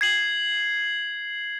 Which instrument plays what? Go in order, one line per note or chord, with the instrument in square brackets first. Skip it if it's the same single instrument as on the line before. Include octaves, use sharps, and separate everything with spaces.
[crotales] G#6 C7 F#7